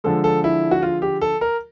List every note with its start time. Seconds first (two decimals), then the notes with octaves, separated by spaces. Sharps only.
0.04 D3 F3 G#3 A4
0.24 A4
0.44 E4
0.71 F#4
0.82 F4
1.02 G4
1.21 A4
1.41 A#4